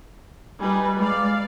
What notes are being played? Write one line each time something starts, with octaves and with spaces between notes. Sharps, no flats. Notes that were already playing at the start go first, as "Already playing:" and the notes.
G3 D#4 B4 G#5
G#3 D5 F5